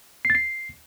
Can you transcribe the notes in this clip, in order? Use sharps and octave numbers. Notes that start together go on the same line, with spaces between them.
C7
A6
C7